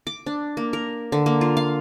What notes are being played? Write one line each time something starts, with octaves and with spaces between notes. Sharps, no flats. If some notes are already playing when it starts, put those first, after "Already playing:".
D6
D4
A#3
A#4
D3
A#3
F4
F5